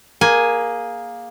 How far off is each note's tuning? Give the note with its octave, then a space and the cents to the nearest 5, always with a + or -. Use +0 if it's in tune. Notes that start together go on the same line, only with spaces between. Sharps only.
A#3 +10 G#4 +0 G#5 +0